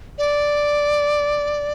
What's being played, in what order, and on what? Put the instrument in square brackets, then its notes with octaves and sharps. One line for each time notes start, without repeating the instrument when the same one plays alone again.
[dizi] D5